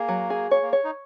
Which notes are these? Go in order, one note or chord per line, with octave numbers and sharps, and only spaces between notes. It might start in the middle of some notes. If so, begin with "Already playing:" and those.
Already playing: A#3 G#4
F#3
G#4
A#3 C#5
A#3
C#5
D#4